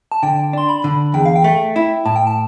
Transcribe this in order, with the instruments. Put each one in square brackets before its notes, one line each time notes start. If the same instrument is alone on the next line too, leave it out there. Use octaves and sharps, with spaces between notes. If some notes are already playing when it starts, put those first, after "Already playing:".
[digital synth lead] A5
[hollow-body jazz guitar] D3 [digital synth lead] G5
[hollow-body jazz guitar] D4 [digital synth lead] C6
[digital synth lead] B5
[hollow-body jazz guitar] D3
[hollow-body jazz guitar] E2 [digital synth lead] G5
[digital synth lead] F5
G5
[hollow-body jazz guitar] A3
E4
[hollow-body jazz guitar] A2 [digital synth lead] A5
[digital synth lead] G5
A5